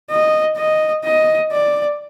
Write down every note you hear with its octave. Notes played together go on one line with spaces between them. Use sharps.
D#5
D#5
D#5
D5